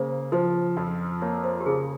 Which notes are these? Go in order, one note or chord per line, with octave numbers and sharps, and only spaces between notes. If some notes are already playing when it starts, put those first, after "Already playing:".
Already playing: C#3 A#3 C5
F3 C5
F2
A#3 C#5
C5
G4
C#3 G#4